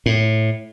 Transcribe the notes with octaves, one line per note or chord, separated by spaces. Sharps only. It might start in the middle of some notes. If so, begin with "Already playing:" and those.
A2